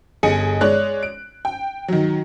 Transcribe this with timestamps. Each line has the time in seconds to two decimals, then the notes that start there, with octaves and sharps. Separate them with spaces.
0.23 G1 G#4 D#5 G#5 C#7
0.61 G#3 C#5 D5 F#6
1.03 D7
1.45 G5
1.88 D#3 F#3